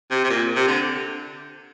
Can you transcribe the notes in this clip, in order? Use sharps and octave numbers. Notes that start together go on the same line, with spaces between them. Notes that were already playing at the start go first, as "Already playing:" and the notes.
C3
C3
A#2
C3
D3